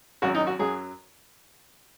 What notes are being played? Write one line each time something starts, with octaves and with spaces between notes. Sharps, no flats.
G#1 F#2 F#3 F#4
D#4
F#4
F#2 F#3 G#4